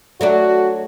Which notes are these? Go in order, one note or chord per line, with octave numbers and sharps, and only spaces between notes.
F#3 A3 D4 F#4